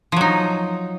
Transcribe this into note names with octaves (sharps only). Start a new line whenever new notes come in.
F3 F#3 D#4